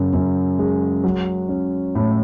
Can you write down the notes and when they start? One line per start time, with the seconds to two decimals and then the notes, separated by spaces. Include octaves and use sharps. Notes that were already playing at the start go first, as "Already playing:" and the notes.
Already playing: F#2 C#3
0.13 F#2
0.59 G#3
1.04 F#3
1.49 C#4
1.95 A2